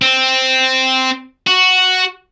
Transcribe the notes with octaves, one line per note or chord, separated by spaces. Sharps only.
C4
F#4